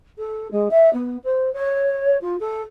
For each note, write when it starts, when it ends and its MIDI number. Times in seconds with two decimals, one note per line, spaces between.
0.17 0.50 69
0.51 0.68 56
0.70 0.91 76
0.93 1.17 59
1.23 1.52 72
1.53 2.17 73
2.21 2.36 65
2.39 2.62 69